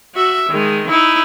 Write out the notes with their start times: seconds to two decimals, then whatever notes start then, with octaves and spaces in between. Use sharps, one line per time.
0.14 F#4 E5
0.50 D#3 G#3
0.90 D#4 E4